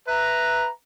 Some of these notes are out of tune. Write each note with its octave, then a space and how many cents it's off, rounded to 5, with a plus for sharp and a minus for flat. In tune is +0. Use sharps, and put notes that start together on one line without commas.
B4 +0 E5 +0 A#5 +0